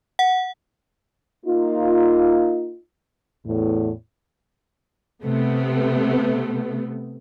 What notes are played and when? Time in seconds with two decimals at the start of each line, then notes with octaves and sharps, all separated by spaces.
0.19 F#5
1.45 A#3 D#4 F4
3.46 E2 A2
5.23 C3 A3 B3